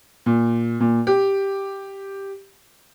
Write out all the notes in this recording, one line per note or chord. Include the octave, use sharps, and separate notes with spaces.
A#2
A#2
G4